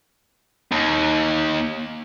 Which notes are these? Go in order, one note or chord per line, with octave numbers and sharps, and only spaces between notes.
D#2